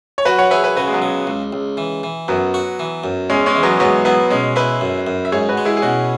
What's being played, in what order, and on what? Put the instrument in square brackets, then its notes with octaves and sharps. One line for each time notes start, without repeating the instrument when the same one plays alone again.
[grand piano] C#5
[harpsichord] F#3 [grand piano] F#4 B4
[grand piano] C#5 F#5
[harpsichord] G#4 [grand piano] B4 E5
[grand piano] B4 E5
[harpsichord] C#3 [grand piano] F#4 B4
[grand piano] G#3
F#3 B3
[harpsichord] C#3
C#2
C#2
E3
E3
[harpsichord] F#2 [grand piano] F#3 B3
[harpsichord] F#4
E3
F#2
[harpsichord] E2 [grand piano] G#3 C#4
[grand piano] G#3 C#4
[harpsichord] E3
[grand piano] F#3 B3
[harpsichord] G#2 [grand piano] F#3 B3
[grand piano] F#3 B3 [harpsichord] E4
[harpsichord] B2 [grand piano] G#3 C#4
[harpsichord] E4 [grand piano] B4 E5
[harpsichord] F#2
F#2
[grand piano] E5
[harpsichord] G#2 [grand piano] G#4 C#5
[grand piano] F#4 B4
[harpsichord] G#3
[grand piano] E4 G#4
G#4
[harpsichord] B2 [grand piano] C#4 F#4